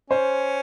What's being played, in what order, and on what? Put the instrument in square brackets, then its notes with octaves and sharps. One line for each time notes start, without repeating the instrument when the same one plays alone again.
[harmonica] C#4 [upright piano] C5